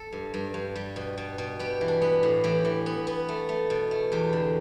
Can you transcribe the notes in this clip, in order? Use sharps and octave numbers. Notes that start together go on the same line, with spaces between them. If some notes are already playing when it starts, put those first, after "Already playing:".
Already playing: A4
G2
G2
G2
G3
B2
B2
B2
B3 G4
E3
D4
B3
A2
E3 G4
E3
B3
B3
A3
A3
B2
A3
E2 G4
D3